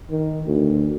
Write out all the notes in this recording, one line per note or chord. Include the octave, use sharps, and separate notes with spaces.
D#3
D2